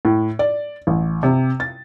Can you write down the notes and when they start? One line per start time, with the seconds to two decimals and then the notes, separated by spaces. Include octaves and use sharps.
0.05 A2
0.39 D5
0.87 A1
1.23 C3
1.60 A6